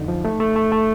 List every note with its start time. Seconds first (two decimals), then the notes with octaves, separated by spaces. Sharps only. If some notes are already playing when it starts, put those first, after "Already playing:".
Already playing: F2 D3 D#4
0.08 F3
0.25 A3
0.40 A3
0.56 A3
0.72 A3